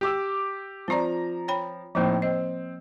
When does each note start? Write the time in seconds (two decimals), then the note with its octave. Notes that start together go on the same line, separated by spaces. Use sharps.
0.01 G4 D6 E6
0.88 F3 C4 F4 D5 A#5
1.48 C#5 G5 B5
1.95 A2 F3 A#3 C4 D#4
2.22 C4 D#5